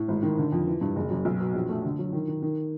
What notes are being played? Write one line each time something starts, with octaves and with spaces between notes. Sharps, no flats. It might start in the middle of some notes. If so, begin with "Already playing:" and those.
Already playing: A2
G#1
D#3
D3
F2
E3
G2
F#1
F#2
B1
B2
A#1
A3
D3
F#3
D#3
D#3
D#3